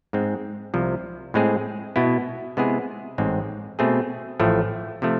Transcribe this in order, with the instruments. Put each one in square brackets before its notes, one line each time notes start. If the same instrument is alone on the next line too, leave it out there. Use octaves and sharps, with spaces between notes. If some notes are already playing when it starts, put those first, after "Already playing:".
[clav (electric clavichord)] G#2 G#3 C4
C2 C3 F3
A2 G#3 C4 G#4
B2 B3 E4
C3 G#3 B3 E4 G#4
A1 G#2 G#3 C4
B2 A3 C4 G#4
A1 A2 F3 A3
C3 F3 A3